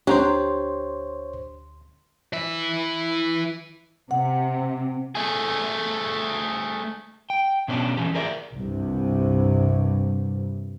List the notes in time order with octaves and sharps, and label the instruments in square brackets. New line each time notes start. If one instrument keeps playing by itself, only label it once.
[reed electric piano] D2 C6 [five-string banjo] D4 A#5 [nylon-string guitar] G4 [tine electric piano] C5 C#5
[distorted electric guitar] E3 E5
[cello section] C3 [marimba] F#5
[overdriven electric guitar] A3 G#4
[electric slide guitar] G5
B2 B3 C#4 D4 E4 G4
D3 E3 F3 C#4 G4
G#4 A#4 D5 E5
[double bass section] C2 G2 C3